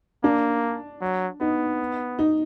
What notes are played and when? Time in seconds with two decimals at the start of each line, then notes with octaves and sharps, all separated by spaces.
0.24 A#3 D4
1.01 F#3
1.41 B3 D#4
2.19 D#4